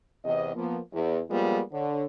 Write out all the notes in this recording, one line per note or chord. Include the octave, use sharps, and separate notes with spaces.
E2 C3 D#5
F3 A#3 B3
E2
F3 G3 G#3 A#3 B3 F4
D3 C#5